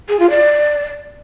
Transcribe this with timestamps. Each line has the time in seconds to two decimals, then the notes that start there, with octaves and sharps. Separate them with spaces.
0.09 G#4
0.19 F4
0.30 D5